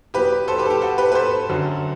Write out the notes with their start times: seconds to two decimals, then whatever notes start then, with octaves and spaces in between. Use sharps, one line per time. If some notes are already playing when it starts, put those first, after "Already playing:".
0.14 E2 B2 F#3 B3 G4 B4
0.48 A4 C5
0.58 G4 B4
0.65 A4
0.70 G4
0.82 F#4 A4
0.98 G4 B4
1.12 B4
1.15 A4 C5
1.49 F#2 D3 F#3